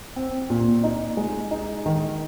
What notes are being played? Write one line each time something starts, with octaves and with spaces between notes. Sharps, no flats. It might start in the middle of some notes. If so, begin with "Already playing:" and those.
C4
A#2
D#4
G#3
D#4
D#3